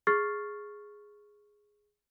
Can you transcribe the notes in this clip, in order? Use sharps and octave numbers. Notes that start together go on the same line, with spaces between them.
G#4 C#6 F6 A6 C7